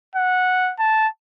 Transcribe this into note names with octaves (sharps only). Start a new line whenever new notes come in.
F#5
A5